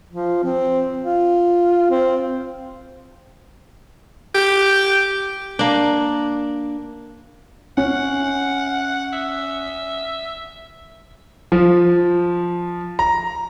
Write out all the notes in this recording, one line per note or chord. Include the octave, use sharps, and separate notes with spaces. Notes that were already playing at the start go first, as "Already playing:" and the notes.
F3
C4
F4
C4
G4
A#3 D4
C#4 F#5
E5
F3
A#5